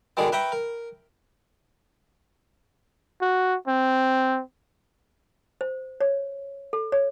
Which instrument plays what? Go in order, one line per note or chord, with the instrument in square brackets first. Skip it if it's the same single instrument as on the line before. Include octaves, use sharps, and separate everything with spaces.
[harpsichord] B2 D3 D#3 G#3 G#4
B4 E5 G5 A#5 B5 C#6
A#4
[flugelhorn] F#4
C4
[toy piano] C5
C#5
A4
C#5